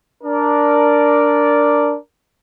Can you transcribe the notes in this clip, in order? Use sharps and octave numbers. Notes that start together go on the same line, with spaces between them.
D4 A#4 D5